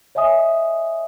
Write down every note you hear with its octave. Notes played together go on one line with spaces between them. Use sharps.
C#5 D#5 E5 G#5 D#6